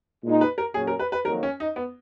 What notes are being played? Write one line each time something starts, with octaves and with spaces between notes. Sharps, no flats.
A#2 G#3 D#4
B4
A#4
A#2 F#3 C#4 G#4
A#4
B4
B4
F2 D#3 F#3 A#3 A#4
C#4
D#4
B3